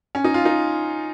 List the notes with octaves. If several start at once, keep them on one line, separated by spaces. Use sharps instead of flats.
C#4
D#4
F4
D#4